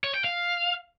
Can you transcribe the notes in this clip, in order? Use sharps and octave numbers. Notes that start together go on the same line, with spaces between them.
C#5
G5
F5